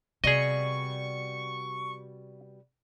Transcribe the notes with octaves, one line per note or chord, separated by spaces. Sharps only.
C3 G3 B3 F#4 G#4 D#5 C#6